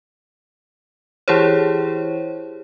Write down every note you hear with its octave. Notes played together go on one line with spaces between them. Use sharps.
E3 E4 G4 G#4 C5 C#5